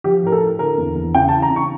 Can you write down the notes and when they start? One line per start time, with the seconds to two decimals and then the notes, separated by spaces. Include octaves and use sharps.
0.04 F3 G4
0.24 A2 A#4
0.32 A4
0.41 A2
0.59 D3 A#4
0.78 E2
0.96 E2
1.15 C#3 G5
1.29 A5
1.32 E3
1.42 A#5
1.50 C#3
1.56 C#6